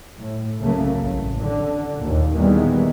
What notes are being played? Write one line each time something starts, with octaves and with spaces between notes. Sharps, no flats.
A2
C2 F#2 C#3 A3 A#3
A1
D3
D#2 A#2
A#2 D#3 E3 G3 G#3 B3